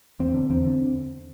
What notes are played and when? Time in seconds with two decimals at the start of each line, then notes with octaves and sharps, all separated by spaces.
0.19 E2 C4
0.34 D3
0.50 E2 C4
0.65 D3